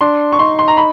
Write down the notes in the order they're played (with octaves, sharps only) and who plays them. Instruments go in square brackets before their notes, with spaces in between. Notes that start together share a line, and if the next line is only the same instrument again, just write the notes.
[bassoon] D4 [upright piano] C6
[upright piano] C#6
[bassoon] D#4 [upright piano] C6
[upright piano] C6
A#5
B5